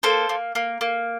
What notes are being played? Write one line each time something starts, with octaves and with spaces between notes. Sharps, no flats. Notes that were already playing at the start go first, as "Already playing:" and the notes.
A#3 A4 C5
A#3
A#3
A#3